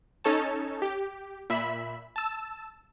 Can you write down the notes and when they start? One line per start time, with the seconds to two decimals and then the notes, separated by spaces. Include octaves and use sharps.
0.24 C#4 D#4 A4 C#5 A5
0.82 G4
1.50 A#2 E5 B5 B6
2.16 A5 E6